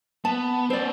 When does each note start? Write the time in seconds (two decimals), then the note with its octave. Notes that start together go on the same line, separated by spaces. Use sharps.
0.25 B3 A5
0.70 C4 C#4 C5 D5